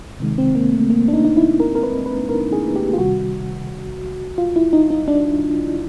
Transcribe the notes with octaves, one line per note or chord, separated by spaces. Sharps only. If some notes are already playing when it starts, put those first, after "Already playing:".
C3 D#3 G#3
C4
A#3
A3
A#3
D4
D#4
D#4
E4
A#4
A#4
B4
B4
A#4
G#4
G4
F4
C3 D#3 G3 F#4
F4
E4
D#4
D#4
D4